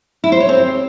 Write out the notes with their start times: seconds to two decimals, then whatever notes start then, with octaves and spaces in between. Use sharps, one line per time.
0.24 E4
0.32 C5
0.40 C#5
0.49 C4